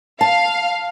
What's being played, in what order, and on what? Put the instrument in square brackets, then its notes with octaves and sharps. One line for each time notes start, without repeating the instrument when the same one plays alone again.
[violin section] F5 [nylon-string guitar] A5